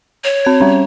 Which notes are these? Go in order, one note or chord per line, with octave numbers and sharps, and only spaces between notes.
C#5
C4 G#6
G3 C#4